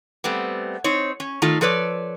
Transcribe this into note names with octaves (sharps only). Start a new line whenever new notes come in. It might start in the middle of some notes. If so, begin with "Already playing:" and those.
G3 A3 B3 C4
C4 D#4 C#5
C#4
D#3 A3 D#4 F4 A4
F3 A4 B4 C#5 D5